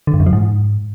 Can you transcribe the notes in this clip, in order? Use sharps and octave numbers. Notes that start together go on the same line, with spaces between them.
D3
G2
F#2
F3
G#2